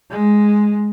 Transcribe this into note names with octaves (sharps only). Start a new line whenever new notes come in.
G#3